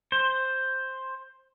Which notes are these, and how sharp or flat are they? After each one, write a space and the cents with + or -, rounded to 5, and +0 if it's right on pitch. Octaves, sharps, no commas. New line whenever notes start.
C5 +5